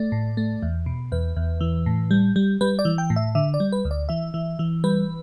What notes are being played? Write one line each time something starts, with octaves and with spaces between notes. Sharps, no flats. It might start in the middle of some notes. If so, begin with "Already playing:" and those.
Already playing: A3 D5
A2
A3
E2
B2
E2 B4
E2
E3
A2
G3
G3
G3 B4
D5
E3
G5
A2
E5
D3 E5
D5
G3
B4
D2
D5
E3 E5
E3
E3
G3 B4